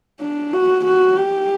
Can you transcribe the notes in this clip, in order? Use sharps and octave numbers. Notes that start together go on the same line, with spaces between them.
D4
F#4
F#4
G4